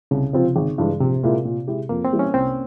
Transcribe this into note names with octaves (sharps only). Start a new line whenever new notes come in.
C2 C#3
C3 F3 C4 F4
G#1
G2 E3 G#3
A#1 C3
A#2 G#3 E4 A#4
A#2
G#3 E4 G4
F2 A#3
C4
E3 G3 A#3 E4
C#4
C2 C4